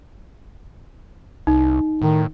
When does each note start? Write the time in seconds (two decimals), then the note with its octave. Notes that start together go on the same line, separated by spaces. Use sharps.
1.47 C2 D#4
2.02 A2 D#3